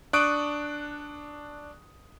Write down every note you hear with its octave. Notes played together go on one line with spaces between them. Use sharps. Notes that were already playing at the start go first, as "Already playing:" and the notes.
D4 C#6 D#6 F#6 D7